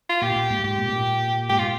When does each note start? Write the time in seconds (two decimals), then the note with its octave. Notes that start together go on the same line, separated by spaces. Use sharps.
0.09 F4
0.22 A#2 G4
0.36 A#2
0.50 G#2
0.64 G#2 G4
0.78 A#2
0.93 A#2
1.49 G#2 G4
1.59 F4
1.63 A#2